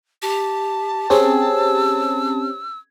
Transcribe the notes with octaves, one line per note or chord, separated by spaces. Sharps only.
G4 A5
C4 C#4 G4 G#4 E6